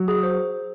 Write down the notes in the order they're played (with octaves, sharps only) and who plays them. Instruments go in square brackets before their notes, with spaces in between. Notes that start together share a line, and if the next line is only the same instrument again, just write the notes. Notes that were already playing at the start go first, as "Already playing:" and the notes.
Already playing: [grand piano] F#3
[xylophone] G#4
C5